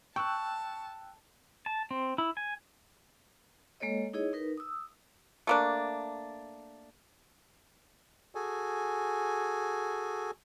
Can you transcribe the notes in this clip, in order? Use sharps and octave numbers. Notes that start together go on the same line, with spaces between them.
G5 A5 C#6 E6 F#6
A5
C4
E4
G#5
G#3 A#3 A4 C#5 D#5
D#4 E4 G#4 C#5 D#5
D#4 A#4 B4
D#6 E6
A3 A#3 D4
F#4 G#4 A4 G#5